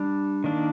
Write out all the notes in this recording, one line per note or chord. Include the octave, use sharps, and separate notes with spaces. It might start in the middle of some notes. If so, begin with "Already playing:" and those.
Already playing: G3 D4
D#3 A#3 D4